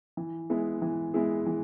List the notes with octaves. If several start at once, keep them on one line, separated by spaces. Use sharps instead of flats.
E3
G#3 B3 E4 G#4
E3
G#3 B3 E4 G#4
E3